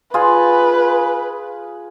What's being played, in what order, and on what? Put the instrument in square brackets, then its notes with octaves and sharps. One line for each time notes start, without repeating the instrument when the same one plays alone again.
[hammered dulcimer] F4 G#4 [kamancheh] B4